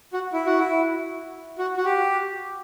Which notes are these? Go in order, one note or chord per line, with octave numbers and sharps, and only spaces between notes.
F#4
E4
F#4
E4
F#4
F#4
G4